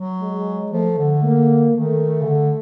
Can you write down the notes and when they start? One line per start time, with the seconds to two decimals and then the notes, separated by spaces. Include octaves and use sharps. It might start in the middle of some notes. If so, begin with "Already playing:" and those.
Already playing: F#3
0.20 G#3
0.72 F3 A3
0.99 D3
1.24 A#3
1.76 D#3 A3
2.22 C#3
2.27 D3